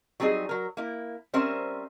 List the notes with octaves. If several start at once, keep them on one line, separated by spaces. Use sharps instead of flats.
F#3 G3 C4 D#4 G#4
F#3 A#4
A#3 E4
G3 C4 C#4 A#4 C5 E5